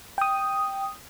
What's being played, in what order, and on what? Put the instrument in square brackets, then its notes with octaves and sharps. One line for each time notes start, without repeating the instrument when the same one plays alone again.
[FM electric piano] G5 D#6